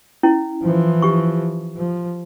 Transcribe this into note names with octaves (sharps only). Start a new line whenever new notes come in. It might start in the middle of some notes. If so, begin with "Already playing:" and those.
C#4 E4
E3 F3
G4 C#6
F3